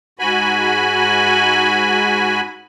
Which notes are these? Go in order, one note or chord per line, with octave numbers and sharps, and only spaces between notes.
G#2 F#4 G#5 B5